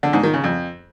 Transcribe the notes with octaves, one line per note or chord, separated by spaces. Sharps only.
D3
G#2
D#3
C#3
F2